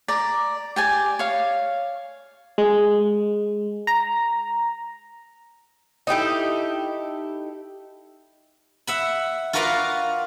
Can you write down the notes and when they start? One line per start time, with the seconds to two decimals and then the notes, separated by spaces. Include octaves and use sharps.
0.08 D5 A#5
0.76 G4 D5 G#5
1.19 C#5 F5
2.58 G#3
3.87 A#5
6.07 D#4 E4 G4 A4
8.87 E5 F#5 B5
9.53 F4 F#4 A#4 B4 D5 F5